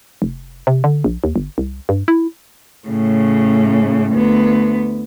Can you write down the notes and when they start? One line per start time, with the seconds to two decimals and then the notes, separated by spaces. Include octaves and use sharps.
0.22 F1
0.67 C3
0.84 D3
1.04 A#1
1.24 D#2
1.36 G1
1.58 C2
1.89 G2
2.08 E4
2.88 A2 C#3
4.12 D2 B3